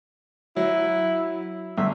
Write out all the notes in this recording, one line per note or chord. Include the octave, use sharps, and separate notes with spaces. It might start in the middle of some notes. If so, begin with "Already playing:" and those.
F#3 E4
G1 E5